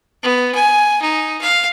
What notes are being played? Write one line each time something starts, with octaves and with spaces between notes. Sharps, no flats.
B3
G#5
D#4
F5